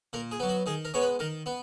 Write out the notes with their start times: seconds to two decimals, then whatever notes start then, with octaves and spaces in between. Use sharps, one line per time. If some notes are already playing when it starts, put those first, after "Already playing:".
0.13 A#2 A#4
0.31 G#4
0.40 F#3 B3
0.49 F#4
0.66 D#3 G#4
0.85 A#4
0.94 G#3 B3 C#5
1.02 B4
1.19 D#3 A#4
1.46 B3